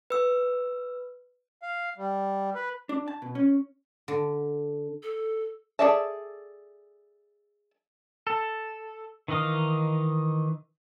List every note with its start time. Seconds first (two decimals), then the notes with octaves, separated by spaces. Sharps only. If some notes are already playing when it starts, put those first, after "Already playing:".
0.10 B4 E6
1.62 F5
1.97 G3
2.55 B4
2.89 D4
3.08 A5
3.22 B2
3.35 C#4
4.08 D3
5.03 A4
5.79 G#4 A4 D5 E5 A5
8.27 A4
9.28 D#3 E3 D#4 D#5 F5